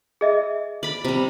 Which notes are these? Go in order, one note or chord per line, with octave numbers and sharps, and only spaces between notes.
G#4 D#5 E5
D5 B5
C3 G3